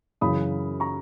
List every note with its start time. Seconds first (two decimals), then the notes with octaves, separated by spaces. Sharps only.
0.21 F#2 C#3 E3 B5 D#6
0.80 A#5 C#6